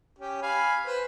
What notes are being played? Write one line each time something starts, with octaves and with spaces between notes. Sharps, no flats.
C#4 G4
F5 G#5 B5
B4 C5